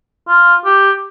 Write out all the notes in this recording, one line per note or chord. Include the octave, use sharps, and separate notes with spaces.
F4
G4